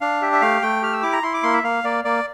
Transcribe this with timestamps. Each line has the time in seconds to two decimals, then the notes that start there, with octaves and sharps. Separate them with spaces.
0.01 D4 F5
0.22 G4 E5
0.33 E5
0.41 A3 F5
0.62 A3 G5
0.82 G4 F6
0.93 E6
1.03 E4 D6
1.13 A#5
1.23 E4 C6
1.34 D6
1.43 A#3 C6
1.53 E5
1.64 A#3 F5
1.84 A#3 D5
2.05 A#3 D5